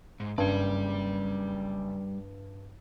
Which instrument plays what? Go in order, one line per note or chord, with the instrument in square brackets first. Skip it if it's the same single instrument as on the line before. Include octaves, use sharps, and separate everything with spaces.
[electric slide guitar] G#2
[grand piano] F#1 C#3 G#6 [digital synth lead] G2 [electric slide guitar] G3 D5